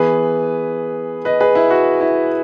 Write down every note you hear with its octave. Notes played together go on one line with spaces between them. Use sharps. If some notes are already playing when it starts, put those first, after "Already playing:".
Already playing: E3 B3 G#4 B4
B4 D#5
G#4 B4
E4
F#4
E4